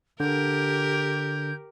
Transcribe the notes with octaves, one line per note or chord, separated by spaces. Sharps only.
D3 G4 A#4 G6